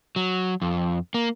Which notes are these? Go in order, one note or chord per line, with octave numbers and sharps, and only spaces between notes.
F#3
F2
A#3